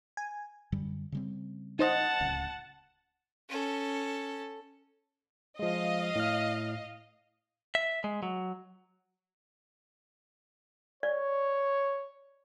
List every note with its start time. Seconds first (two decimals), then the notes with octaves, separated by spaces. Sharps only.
0.17 G#5
0.72 F#2 D3 G3
1.12 C#3 G3 C4
1.79 D#4 C5 D#5 F#5 A5
2.20 D1 C#2
3.49 C#4 A4
5.59 F3 G#3 D#5 F5
6.15 A2 F6
7.75 E5
8.04 G#3
8.23 F#3
11.03 C#5 D5